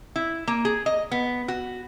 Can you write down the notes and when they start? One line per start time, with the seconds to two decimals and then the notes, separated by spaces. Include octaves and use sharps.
0.16 E4
0.48 A#3
0.65 G#4
0.86 D#5
1.11 B3
1.48 F#4